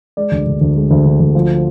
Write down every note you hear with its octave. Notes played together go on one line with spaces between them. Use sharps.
G#3 D5
D2
D3
D2
G#3
D2
D3
D2
F3